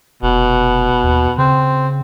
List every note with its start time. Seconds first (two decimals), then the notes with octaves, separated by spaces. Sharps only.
0.23 F1 B2
1.04 D#2
1.38 C#3 C4